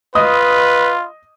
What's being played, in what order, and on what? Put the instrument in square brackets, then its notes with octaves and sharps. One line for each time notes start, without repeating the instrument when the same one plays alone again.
[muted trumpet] F4 [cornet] B4 [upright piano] D#5 D#6